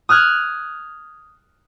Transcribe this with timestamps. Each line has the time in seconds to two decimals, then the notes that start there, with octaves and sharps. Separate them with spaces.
0.09 D#6 F6 F#6 G#6